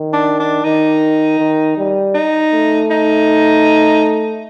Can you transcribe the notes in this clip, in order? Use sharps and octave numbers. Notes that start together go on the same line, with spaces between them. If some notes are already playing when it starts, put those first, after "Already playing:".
Already playing: D#3
D4
D4
D#3 D#4
D#3
G3
D#4
A3
D#4